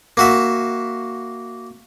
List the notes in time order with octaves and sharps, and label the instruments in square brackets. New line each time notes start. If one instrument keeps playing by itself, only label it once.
[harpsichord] A#3 F#4 E5